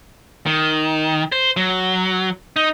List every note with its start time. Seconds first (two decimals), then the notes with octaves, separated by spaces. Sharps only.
0.46 D#3
1.32 C5
1.57 F#3
2.56 D#4